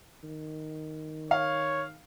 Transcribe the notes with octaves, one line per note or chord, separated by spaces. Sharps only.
D#3
C#5 F5